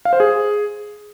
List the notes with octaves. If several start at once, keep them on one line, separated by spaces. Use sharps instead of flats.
F5
C5
G#4